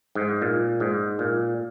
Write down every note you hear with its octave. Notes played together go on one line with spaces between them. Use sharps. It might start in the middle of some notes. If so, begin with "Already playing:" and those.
G#2
A#2
G#2
A#2